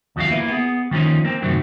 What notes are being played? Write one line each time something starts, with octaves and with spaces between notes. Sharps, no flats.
D#2 F3 F#3 C4 F#4 F5
A#3 E4 B4
B3 G#4
D#3 F3 A#3 C#4 D#4
A#3 C4
F#2 A2 C3 D#3 F#3